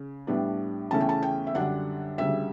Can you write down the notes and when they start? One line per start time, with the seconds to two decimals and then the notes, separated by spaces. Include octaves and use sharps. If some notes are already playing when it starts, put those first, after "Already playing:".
Already playing: C#3
0.27 A2 G3 B3 D4
0.91 E2 C#3 E3 A3 C#4 A5
1.01 G5
1.09 A5
1.22 G5
1.47 E5
1.55 F#2 D3 G3 D4 F#5
2.18 D2 C#3 G3 E5